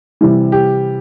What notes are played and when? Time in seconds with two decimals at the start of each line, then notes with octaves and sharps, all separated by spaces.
0.21 C3 E3 G3
0.52 G4